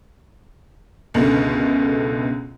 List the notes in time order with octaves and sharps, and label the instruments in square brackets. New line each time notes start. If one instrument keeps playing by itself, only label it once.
[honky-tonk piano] C#2 F#2 B2 D3 A3 A#4